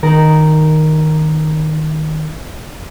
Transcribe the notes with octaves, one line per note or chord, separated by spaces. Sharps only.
D#3 A#4